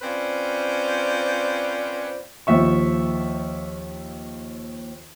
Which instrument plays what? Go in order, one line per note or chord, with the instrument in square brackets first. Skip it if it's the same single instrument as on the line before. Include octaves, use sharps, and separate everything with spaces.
[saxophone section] C4 C#4 F4 B4 C5 D5
[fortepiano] D#2 F3 E5 C#6